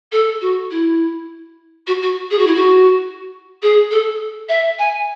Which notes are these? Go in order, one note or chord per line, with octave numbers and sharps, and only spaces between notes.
A4
F#4
E4
F#4
F#4
G#4
F#4
E4
F#4
G#4
A4
E5
G#5